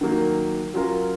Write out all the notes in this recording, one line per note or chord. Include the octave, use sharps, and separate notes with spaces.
D#3 F#3 A#3
F#3 C#4 F4 A#4